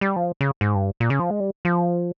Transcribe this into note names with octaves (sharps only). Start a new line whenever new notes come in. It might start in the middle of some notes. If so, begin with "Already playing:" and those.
G3
F3
C#3
G#2
G2
A#2
C#3
F3
G#3
G3
F3